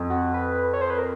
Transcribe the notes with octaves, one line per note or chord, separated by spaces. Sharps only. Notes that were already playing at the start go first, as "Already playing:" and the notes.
Already playing: F2
F#4
B4
C#5
C5
B4
A#4